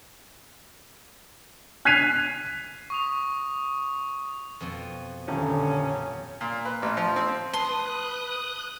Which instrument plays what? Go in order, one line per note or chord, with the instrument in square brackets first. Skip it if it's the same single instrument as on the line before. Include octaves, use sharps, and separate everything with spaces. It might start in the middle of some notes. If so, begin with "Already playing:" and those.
[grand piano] F#6 G#6 B6 C7 D#7 F7
[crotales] C#6 D#6 F7
[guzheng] F2 B2
[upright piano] D#1 [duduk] D3 [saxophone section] C#4
[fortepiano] A#2
B4
A1
F3
C4
[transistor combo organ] B4 [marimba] A5 [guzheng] C6 [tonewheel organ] D#6 F#6